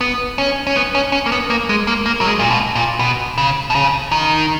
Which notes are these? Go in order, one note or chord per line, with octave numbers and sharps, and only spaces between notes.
B3
C#4
C#4
B3
C#4
C#4
A#3
B3
A#3
G#3
A#3
A#3
F#3
G#3
A#2
B2
A#2
B2
C#3
B2
C#3
D#3